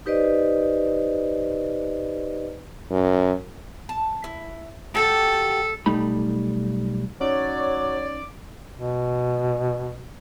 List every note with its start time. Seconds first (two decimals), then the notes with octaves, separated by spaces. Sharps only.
0.06 D#4 G4 B4 C5 D5 D#5
2.91 F#2
3.89 A5
4.24 E4
4.95 F#4 G4 A4 G5
5.86 B1 G3 A3 D#4 B5
7.21 F#3 C#4 D#4 C#5 D5
8.78 B2